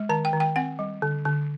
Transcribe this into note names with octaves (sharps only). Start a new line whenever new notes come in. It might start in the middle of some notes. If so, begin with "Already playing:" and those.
Already playing: G#3
D#3 A5
G5
D#3
G5
C4 F#5
G3
D3
D3